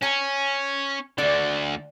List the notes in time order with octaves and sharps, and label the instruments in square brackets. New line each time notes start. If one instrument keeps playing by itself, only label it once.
[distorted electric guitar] C#4 [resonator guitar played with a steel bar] G#5
[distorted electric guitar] D2 D3 [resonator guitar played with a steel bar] D5